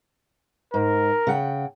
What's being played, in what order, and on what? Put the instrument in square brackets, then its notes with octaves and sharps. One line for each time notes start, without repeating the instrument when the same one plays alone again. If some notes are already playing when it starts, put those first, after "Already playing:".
[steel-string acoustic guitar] G#2 [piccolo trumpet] A#4
[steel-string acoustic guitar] C#3 F#5 G5